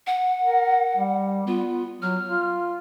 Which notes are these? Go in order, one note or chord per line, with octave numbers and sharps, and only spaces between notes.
F#5
A#4
G3
B3 F4
F#3 F6
F4